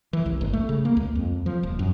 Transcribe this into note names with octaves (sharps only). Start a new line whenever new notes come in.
E3
C2
G1
A3
C#3
A#3
C#2
F2
F3
D#1
F#2